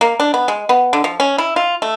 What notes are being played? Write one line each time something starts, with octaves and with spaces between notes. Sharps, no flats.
A#3
D4
B3
G#3
B3
D3
F3
C#4
E4
F4
A3